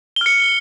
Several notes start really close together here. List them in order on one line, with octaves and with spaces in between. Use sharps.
G7 F6 C#7